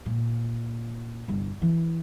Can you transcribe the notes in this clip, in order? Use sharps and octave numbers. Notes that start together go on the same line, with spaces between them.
A#2
G1 C2
E3